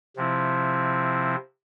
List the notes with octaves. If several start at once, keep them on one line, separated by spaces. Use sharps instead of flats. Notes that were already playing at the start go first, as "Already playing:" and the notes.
C3 F3 C4 E4